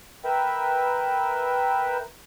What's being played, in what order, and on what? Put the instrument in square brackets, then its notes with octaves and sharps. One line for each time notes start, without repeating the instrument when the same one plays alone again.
[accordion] A#4 B4 E5 G5